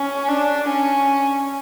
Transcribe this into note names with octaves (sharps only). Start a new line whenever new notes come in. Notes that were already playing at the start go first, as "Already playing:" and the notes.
Already playing: C#4
D4
C#4